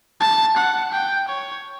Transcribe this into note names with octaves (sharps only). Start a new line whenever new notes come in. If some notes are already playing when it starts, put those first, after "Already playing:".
A5
F#5
G5
C#5